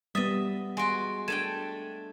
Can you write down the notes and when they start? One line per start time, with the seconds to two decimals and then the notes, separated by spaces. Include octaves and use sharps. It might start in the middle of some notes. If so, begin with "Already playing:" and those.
0.15 G3 B3 D#5 E5 D#6 A6
0.77 G#3 F#4 G#5 C6 D7
1.28 A3 D4 G5 G#6 D#7 E7